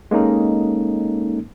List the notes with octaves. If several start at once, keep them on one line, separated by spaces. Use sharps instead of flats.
G#3 A#3 C#4 D#4 A4